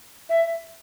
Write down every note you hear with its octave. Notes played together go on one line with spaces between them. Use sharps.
E5